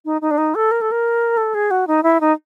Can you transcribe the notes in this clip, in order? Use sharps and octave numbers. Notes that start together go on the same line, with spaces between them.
D#4
D#4
D4
D#4
A4
A#4
A4
A#4
A4
G#4
F#4
D#4
E4
D#4